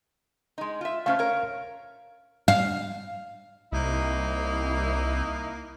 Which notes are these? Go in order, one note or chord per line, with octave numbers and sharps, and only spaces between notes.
G#3 D#4
F4 E5
A3 C#4 C5 F5 F6
A#4 C#5
F5
C2 A#3 D#4 E4